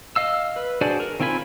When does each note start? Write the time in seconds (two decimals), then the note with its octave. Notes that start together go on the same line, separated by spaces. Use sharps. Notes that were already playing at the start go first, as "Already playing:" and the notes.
0.16 D#5 F5 E6
0.56 B4
0.81 D4 F#4 G#4 C5 D5
1.00 A#4
1.20 D#3 C4 F4 G#5 B5